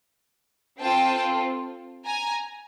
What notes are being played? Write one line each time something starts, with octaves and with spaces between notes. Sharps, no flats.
C4 F4 A4 G5 A5
G#5 A#5